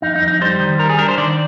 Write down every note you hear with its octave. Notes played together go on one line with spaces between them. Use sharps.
F2 D#4
D#4
F2
D#4
G3 C5
D#3
G3 A#4
G#4
D4 A#4
C5
D#3 D5